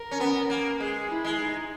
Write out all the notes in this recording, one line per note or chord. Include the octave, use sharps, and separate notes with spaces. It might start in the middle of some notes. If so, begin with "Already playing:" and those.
Already playing: A#4
C#4
B3
A#3
G#3 G#4
E4
G#3
D#4